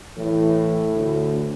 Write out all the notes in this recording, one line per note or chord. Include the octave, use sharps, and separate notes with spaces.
A2 E3
D2